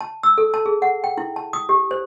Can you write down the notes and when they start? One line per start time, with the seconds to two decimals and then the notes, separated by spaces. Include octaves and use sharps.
0.01 A5
0.23 E6
0.38 A4
0.54 A5
0.66 G#4
0.82 F#5
1.04 G5
1.18 E4
1.36 A5
1.53 D#6
1.69 G4
1.91 C5